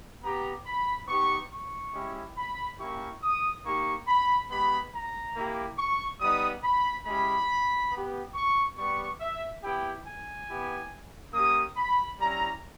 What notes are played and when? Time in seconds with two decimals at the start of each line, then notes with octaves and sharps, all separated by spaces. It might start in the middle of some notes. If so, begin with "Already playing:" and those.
0.23 B3 G4 A#5
0.66 B5
1.07 B3 D#4 G4 C#6
1.51 C#6
1.93 G#3 C#4 E4 G4
2.37 B5
2.79 A#3 C#4 E4 G4 C#6
3.22 D#6
3.64 A#3 D#4 G4 C#6
4.08 B5
4.50 G#3 B3 G4 B5
4.93 A#5
5.36 A#3 E4 G4
5.78 C#6
6.20 G3 B3 D#4 D#6
6.64 B5
7.06 G#3 C#4 E4 G4 B5
7.92 B3 G4
8.34 C#6
8.77 G3 B3 G4 C#6
9.21 E5
9.63 B3 E4 G4 G5
10.06 G#5
10.49 B3 E4 G4
11.33 A#3 C#4 G4 D#6
11.77 B5
12.19 G3 C#4 E4 A#5